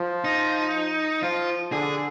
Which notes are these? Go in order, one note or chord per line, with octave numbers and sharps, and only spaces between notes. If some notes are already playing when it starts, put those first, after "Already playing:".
Already playing: F3
D#4
F3 F4
D3 G#4